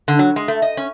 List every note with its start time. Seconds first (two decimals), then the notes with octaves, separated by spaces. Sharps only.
0.08 D3
0.19 F#3
0.36 G#3
0.48 A3
0.62 D#5
0.77 C#4